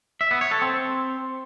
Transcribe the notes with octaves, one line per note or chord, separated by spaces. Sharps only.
E5
B3
C#5
A4
C4